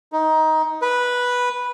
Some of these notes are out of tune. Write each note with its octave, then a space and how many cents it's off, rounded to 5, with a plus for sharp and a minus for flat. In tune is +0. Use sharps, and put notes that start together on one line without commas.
D#4 +15
B4 -10